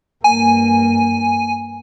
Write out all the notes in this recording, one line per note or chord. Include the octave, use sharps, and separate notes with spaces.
G2 A#3 G#5